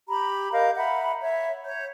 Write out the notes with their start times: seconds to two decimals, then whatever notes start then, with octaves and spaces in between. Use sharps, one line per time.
0.08 G4 A#5 B5
0.52 A#4 D#5 F5 G6
0.76 E5 F#5 A#5 B5
1.21 C#5 E5
1.64 C#5 G6